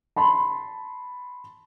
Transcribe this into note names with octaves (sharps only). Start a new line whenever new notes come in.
A5 B5 C6